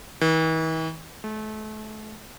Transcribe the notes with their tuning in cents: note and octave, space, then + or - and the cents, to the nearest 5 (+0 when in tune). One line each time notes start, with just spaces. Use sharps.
E3 -45
A3 -35